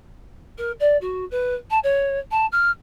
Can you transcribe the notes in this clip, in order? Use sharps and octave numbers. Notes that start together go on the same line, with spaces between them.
A#4
D5
F#4
B4
A5
C#5
A5
F6